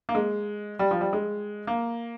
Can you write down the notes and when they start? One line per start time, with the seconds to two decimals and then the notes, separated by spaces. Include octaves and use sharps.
0.09 A#3
0.15 G#3
0.79 G3
0.91 F3
1.01 G3
1.13 G#3
1.67 A#3